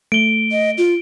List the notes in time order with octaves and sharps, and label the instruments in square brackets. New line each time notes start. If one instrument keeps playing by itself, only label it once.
[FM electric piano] A3 [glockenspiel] D7 G7
[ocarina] D#5
F4